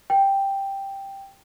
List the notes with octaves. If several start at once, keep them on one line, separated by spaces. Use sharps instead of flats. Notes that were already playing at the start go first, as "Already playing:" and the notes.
G5